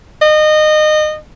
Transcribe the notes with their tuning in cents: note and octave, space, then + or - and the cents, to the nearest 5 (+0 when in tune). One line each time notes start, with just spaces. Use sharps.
D#5 -25